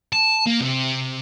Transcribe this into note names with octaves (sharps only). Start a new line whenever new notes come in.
A5
A#3
C3